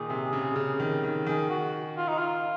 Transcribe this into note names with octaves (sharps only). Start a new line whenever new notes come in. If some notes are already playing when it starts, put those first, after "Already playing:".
Already playing: A#2 D#3 G#4
C3
C#3
C#3
D#3
D#3
D#3 G#4
F#4
F4
D#4
F4